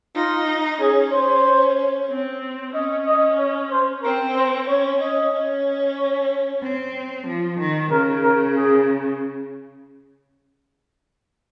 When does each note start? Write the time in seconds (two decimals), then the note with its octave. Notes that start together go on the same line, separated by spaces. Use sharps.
0.15 D#4 F4
0.80 C#4 G#4
1.12 C5
2.09 C4
2.74 C#4 D#5
3.06 D#5
3.38 C#5
3.71 C5
4.03 C4 A#4
4.35 C5
4.67 C#4 C#5
5.00 C#4 D#5
5.33 C#4
5.97 C#5
6.62 C4
7.26 F3
7.59 D#3
7.91 C#3 A#4
8.23 A#4
8.56 G#4